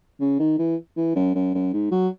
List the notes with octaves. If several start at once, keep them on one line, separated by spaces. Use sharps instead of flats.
C#3
D#3
E3
E3
F#2
F#2
F#2
G#2
F#3